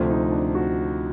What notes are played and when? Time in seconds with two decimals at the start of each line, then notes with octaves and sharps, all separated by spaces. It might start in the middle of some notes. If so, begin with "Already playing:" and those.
Already playing: D2 C3 F3
0.11 D#4
0.32 D4
0.55 F#4